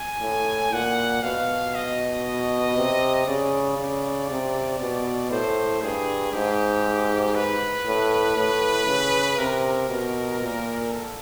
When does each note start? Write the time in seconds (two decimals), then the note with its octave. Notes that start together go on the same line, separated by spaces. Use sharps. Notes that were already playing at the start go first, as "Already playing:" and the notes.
Already playing: G#5
0.22 A2
0.73 A#2 F#5
1.23 B2 F5
1.75 D#5
2.77 C3
3.28 C#3 D5
3.78 C#3
4.30 C3
4.80 B2
5.31 A2 C5
5.82 G2 G#4
6.33 G#2 G4
7.35 B4
7.86 A2
8.37 A2
8.87 C#3
9.38 C3 A#4
9.89 B2
10.41 A#2
10.91 A4